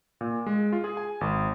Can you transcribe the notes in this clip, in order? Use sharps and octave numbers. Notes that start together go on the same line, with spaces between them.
A#2
G#3
F4
G#4
G#5
G#1